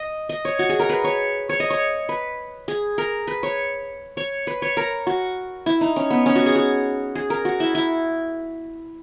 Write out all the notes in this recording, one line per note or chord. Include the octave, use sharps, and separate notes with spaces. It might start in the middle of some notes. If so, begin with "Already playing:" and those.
Already playing: D#5
D#5
C#5
F#4
G#4
A#4
B4
C#5
C#5
D#5
C#5
B4
G#4
A#4
B4
C#5
C#5
B4
C#5
A#4
F#4
E4
D#4
C#4
B3
C#4
F#4
G#4
F#4
G#4
A#4
F#4
E4
E4